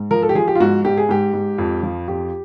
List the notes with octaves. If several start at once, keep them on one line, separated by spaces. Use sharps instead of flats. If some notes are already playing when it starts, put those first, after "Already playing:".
Already playing: G#2
F3 A#4
A4
G4
F3 G#4
G4
F4
G#2 F#4
G#2 G4
G#4
G#2 G4
G#2
F2
F3
F2 G4